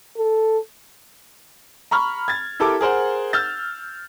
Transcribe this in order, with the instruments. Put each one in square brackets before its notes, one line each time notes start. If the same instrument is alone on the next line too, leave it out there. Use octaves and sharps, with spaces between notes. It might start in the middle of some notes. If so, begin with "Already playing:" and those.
[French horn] A4
[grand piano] A#5 B5 C#6 F6
G#6 A6
E4 G4 A4 A#4 A5 D6
G#4 A#4 C5 F#5
E6 F6 G6 A6